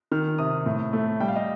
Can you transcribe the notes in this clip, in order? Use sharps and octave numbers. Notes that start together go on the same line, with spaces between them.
D#3 F6
C3 D#6
A2
A3
G3 G5
F5
D#5